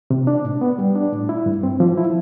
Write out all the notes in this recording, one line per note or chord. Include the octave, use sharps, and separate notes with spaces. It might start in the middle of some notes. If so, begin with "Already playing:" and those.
C3
D4
A2
B3
G3
D4
A2
E4
G2
C4
F3
E4